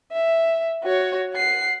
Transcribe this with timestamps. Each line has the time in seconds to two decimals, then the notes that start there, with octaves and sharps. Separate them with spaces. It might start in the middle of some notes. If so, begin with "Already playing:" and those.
0.12 E5
0.84 F#4 C#5
1.34 F#5 C7